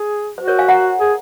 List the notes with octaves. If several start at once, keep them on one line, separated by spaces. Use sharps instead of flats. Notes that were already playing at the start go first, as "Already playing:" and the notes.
Already playing: G#4
F#4 C5
A#4 C#5
F5 G#5
F#5 A#5
G#4